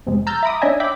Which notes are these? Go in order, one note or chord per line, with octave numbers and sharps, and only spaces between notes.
F2 C3 G#3
A#5 E6 F6 G6 A6
E5 A#5 B5 D6 D#6
D4 D#4 C#5 D#5 E5 G#5
E5 G5 B5 D6